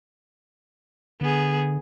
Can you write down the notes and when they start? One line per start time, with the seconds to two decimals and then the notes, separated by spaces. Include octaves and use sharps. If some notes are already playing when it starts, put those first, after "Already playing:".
1.21 D3 B3 G#4